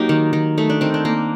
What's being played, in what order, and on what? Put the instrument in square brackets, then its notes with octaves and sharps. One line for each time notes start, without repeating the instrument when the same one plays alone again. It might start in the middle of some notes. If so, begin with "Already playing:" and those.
Already playing: [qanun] F#3 A#3 D#4 G4
D#3
D#3
A3 D#4
D4
D#3 C4
D4
A#3